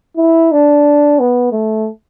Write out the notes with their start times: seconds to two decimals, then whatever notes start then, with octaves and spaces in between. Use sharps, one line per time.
0.17 E4
0.52 D4
1.20 B3
1.52 A3